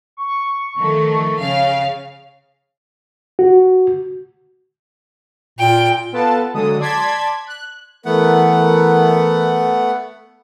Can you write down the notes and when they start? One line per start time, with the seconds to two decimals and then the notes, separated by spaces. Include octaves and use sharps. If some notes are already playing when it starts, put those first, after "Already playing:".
0.17 C#6
0.78 D#3 F3 A3
1.39 C#3 F5
3.39 F#4
5.59 A#2 G5
6.12 B3 F4 A4 B4 A5
6.54 D3 F#3 G#3 A4 D#6
6.79 D5 A5 C6 G#6 B6
7.46 F#6
8.05 E3 A3 B3 A#4 F#5